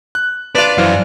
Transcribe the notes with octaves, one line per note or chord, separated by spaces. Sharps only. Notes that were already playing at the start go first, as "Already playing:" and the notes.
F#6
D4 F4 B4 D5
F#2 E3 C5 F5